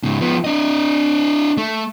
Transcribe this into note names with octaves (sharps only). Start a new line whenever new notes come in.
G#2 C#3
F3 B3
D4 D#5
A3